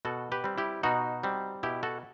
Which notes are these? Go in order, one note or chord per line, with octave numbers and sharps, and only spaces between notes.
B2 F#4 A4
G4 B4
G3 C4
E4 G4
B2 D#4 F#4
G3 C4
B2 E4 G4
F#4 A4